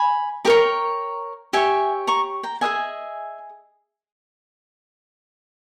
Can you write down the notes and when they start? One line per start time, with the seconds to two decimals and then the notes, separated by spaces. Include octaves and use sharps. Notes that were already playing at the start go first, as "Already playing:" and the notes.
Already playing: G#5 B5
0.45 G4 A#4 C#5 G5 A#5
1.53 G4 C#5 E5 G#5
2.07 A#5 C#6
2.43 G5 A#5
2.61 G#4 B4 D#5 E5 G#5